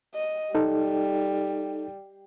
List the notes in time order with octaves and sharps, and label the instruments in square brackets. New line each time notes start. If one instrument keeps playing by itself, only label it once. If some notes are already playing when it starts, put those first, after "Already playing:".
[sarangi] D#5
[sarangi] G3 [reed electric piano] D#4 A4